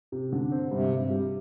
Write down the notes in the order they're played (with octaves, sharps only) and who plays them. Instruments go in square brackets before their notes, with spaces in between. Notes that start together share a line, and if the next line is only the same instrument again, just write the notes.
[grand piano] C3
D3
C4
[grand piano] G2 [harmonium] C3
[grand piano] G2
G3